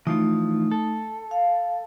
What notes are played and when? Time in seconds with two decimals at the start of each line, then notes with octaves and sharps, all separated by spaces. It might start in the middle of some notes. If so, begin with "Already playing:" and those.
0.07 E3 F3 A3 D#4 F4
0.71 A4
1.31 F5